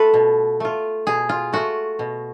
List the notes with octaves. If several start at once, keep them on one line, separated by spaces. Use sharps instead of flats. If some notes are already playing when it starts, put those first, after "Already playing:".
Already playing: A3 F4 A4 B4
B2
A3 F4
B2 G#4
F4
A3 F4 F#4
B2